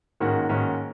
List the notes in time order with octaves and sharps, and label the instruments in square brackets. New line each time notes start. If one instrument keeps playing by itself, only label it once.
[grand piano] G#2 D#3 A#3 C#4 F#4
G#2 D#3 A#3 C#4 F#4